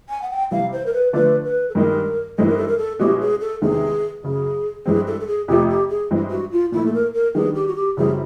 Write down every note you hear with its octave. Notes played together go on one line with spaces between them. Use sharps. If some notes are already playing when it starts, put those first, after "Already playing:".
G#5
F#5
G5
C3 E3 G3 F5
C5
A#4
B4
D3 F3 A3 D4 B4
B4
A4
G2 D#3 G#3 A#4
G2 E3 G#3 C4 D#4 A4
A#4
A4
A#4
A4
B2 G#3 C#4 E4 G4
G#4
A4
E2 C3 D#3 G#3 C4 G#4
F#2 C#3 F#3 G#4
G2 E3 G#3 C4 G#4
A4
A4
G#4
F2 C3 F3 A3 G4
G4
G#4
G2 E3 G#3 C4
F#4
F4
A#2 F3 A3 E4
A4
A#4
A#4
D#3 G3 B3 D4 G#4
G4
F#4
G4
F#2 C#3 E3 G3 C4 G#4